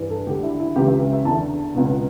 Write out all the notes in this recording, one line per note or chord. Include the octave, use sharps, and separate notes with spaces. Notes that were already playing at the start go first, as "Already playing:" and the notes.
Already playing: G2 E3
A4
D2 D3 G4
E4
E4
C#2 C#3 E3 G4
E5
E5
E2 D3 A5
C#2 B2